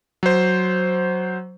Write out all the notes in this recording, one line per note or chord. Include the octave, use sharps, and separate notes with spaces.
F#3 C5